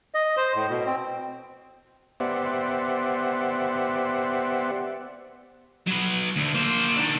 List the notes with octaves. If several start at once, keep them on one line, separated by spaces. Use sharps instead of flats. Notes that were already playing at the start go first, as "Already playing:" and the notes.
D#5
C5
A2
B2
C4
B3 G4 C5 D5 E5 F#5
F#3 B4
D2
A#3 C5
D#3 D4